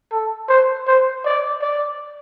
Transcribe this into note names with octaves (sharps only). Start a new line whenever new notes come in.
A4
C5
C5
D5
D5